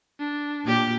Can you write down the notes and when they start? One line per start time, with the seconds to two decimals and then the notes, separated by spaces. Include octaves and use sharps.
0.20 D4
0.65 A#2 G4